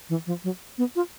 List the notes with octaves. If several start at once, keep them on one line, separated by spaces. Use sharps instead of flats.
E3
F3
F#3
B3
F4